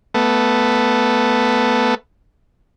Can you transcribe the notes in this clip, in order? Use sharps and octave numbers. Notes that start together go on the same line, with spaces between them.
A3 B3